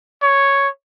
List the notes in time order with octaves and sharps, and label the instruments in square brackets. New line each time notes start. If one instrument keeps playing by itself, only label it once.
[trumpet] C#5